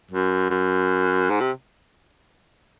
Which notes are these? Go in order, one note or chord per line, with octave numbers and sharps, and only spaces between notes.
F#2
F#2
G#2
C3